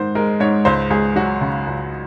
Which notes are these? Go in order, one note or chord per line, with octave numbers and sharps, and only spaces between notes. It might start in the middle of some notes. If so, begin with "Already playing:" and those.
Already playing: G#2 D#3 C5
G#3 A#4
G#2 C#5
C#2 C5
C#2 G#4
F#3 F#4
C#3
C#2